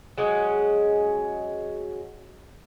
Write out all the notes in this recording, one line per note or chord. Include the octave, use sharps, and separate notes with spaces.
F#3 G#3 C#4